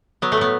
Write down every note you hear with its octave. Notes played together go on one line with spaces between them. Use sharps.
F#3 B3
A3
A2 B3